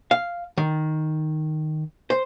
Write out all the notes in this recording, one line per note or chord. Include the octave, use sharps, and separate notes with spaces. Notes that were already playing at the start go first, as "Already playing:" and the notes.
F5
D#3
C5